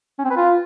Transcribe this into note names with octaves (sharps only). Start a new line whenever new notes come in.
C#4
C4
B4
F4